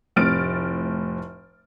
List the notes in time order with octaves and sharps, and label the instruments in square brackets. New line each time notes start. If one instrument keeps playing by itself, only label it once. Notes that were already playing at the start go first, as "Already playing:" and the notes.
[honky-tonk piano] F1 A2 C4 F6 A6 D7